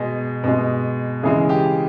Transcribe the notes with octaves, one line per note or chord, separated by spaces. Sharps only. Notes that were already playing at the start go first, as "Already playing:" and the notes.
Already playing: B2 G#3 G#4
B2 G#3
C#3 E3 G#3 G#4
G4